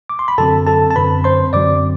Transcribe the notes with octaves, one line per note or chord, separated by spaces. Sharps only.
D6
C6
B5
F#2 D3 F#3 C4 A4 A5
A4 A5
A5
F#2 D3 F#3 C4 B4 B5
C5 C6
F#2 D3 F#3 C4 D5 D6